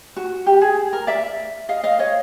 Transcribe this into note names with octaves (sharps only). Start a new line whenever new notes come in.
F#4
G4
G#4
A#4
D5 E5
D#5 F5
D#5 F5
C#5 D#5